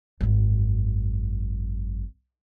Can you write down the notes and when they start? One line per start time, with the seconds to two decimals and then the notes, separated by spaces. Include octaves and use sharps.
0.21 G#1 F#2